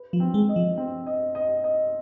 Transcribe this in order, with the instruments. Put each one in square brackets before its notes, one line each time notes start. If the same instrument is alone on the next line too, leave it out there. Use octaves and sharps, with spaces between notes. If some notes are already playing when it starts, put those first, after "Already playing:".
Already playing: [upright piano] B4
[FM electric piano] F3
[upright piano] C4
[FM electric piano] G#3
[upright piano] D#5
[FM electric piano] F3
[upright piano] C4
D#5
D#5
D#5